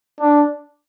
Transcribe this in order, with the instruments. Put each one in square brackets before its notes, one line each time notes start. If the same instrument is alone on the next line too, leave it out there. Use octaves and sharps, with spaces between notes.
[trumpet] D4